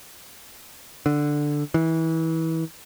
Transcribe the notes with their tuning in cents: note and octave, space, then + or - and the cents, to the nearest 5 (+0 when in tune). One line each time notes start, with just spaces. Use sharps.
D3 +5
E3 -25